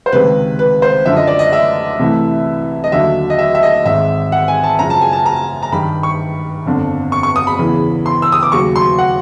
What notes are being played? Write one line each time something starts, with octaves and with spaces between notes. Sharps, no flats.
C5
C#2 C3 D#3 G#3 B4
B4
C5
F#2 D3 F3 E5
D#5
D5
D#5
E5
C2 C3 E3 A3
D#5
D#2 D3 F#3 E5
D#5
E5
E5
D#5
G#1 G#2 D#3 E5
F#5
G#5
A5
F#2 C#3 F3 A#5
A5
G#5
A5
A#5
A#5
G2 D#3 G3 B5
C#6
G1 F2 D3
C#6
C#6
D#6
B5
E2 C#3 E3
C6
E6
D#6
D6
D#2 C#3 F#3 C#6
C6
F#5